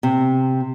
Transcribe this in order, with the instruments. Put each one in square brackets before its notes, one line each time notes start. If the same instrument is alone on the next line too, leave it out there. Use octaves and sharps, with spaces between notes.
[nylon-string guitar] C3